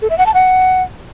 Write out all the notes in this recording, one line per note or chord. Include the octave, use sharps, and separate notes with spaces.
A4
E5
F#5
A5
F#5